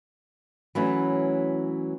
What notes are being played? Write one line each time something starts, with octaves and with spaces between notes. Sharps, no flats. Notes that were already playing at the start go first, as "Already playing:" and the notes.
E3 F#3 A3 C#4